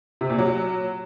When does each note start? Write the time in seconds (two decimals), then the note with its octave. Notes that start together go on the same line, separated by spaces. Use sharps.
0.21 C3
0.30 A#2
0.39 F#3